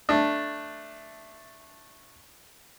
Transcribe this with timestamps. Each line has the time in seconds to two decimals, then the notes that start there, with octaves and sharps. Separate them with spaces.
0.09 A3 D4